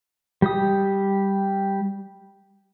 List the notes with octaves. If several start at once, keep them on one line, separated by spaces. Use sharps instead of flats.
G3 G4 D#6